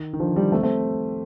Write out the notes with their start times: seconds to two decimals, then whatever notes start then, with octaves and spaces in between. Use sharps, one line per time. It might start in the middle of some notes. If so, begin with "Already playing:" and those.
Already playing: D#3
0.13 D#3
0.20 D3 F3
0.36 D#3 G3
0.52 A3 C4
0.63 A3 C4